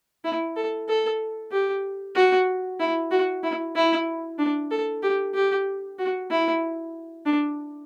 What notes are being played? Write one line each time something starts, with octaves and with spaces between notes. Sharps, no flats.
E4
A4
A4
G4
F#4
E4
F#4
E4
E4
D4
A4
G4
G4
F#4
E4
D4